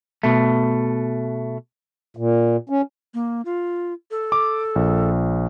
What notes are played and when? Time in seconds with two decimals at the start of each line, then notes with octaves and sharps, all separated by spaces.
0.23 B2 A3
2.17 A#2
2.69 C#4
3.14 A#3
3.45 F4
4.11 A4
4.32 D6
4.76 A#1